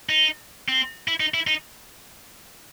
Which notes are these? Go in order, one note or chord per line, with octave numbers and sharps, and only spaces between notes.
D#4
C4
E4
D#4
E4
D#4